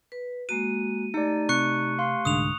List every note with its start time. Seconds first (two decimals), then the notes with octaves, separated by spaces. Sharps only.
0.12 B4
0.49 G#3 A#3 F#4 D#7
1.14 A3 D#4 G4 D5
1.49 C3 C#6 F#6 C#7
1.99 F5 C6
2.25 C2 G#2 D3 D#6 F7